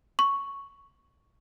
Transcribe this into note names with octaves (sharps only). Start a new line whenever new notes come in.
C#6